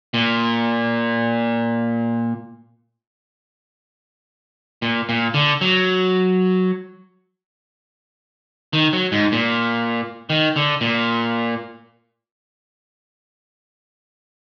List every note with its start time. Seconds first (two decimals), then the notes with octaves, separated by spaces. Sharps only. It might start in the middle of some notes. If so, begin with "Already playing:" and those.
0.14 A#2
4.82 A#2
5.09 A#2
5.34 D3
5.61 F#3
8.73 D#3
8.93 F#3
9.12 G#2
9.32 A#2
10.30 D#3
10.56 D3
10.81 A#2